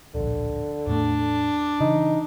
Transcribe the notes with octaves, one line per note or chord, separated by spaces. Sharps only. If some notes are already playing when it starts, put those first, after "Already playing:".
D1 A#1 D3
E2 A2 A3 D4
C#3 E3 D#4